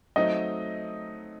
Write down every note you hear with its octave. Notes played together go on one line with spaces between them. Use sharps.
F#3 A3 C4 D#4 D#5